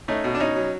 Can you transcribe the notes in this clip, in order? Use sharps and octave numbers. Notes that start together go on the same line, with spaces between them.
A3 C#4 D#4
B2
D4
B2 C#4 D#4
F#3